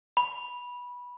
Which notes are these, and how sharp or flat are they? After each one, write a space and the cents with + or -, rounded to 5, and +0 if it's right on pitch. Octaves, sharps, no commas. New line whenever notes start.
B5 -15